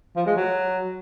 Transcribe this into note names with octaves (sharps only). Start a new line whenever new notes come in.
F3
G#3
F#3